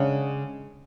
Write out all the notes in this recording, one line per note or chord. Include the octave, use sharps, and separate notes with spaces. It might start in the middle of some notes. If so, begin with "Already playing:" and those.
Already playing: C#3 G#3 D4 F#5